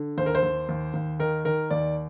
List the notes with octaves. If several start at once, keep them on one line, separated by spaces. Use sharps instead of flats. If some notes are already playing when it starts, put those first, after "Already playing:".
Already playing: D3
D#2 C5
A#4
C5
D#2
D#2
D#2
D#3 A#4
D#3 A#4
D#2 D5